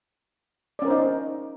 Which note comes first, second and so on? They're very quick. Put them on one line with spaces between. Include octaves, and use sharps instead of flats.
D5 C#4 A#4 C5 D#4